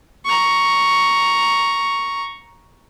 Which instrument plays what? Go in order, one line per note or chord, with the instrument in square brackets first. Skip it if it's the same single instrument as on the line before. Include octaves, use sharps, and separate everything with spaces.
[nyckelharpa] A#5 C#6